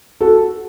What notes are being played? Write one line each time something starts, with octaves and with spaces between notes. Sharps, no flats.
F#4 A4